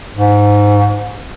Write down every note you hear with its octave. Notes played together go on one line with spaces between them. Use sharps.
G#2